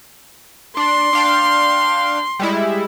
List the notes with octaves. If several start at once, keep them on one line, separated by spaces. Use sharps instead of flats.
D4 C6
D4 F5 G5
G3 G#3 E4